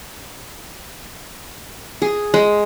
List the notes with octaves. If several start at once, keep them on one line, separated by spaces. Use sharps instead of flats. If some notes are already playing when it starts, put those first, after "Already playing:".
G#4
G#3